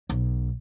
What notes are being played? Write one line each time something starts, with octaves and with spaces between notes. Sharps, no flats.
B1